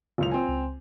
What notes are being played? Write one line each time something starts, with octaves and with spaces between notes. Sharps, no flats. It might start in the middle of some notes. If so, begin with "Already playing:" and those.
F#1 C#2 F4 F7
C4 G#5
C#2